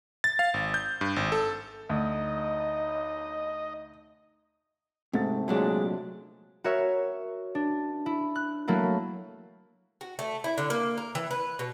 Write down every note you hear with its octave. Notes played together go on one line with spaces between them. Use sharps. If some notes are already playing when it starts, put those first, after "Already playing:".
A6
F5
G#1
G6
G2
G#1
A4
D2 D#4 D#5
G#2 C3 A3 A6
A#2 F#3 G#3 D4
F#4 A#4 C#5 E5
D4
E4
F#6
F#3 A3 A#3 E4
F#4
A3
E4
D3
A#3
A#4
E3
B4
B2